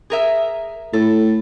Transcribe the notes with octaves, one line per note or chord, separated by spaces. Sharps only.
G#4 A#4 E5
A2 A4